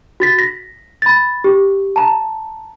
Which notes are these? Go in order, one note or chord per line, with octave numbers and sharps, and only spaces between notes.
F#4 A6 B6
A#6 B6
B5 A6
G4
A5 A#5